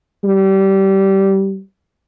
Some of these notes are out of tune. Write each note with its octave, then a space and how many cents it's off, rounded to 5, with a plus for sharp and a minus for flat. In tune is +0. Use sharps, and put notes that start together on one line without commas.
G3 -20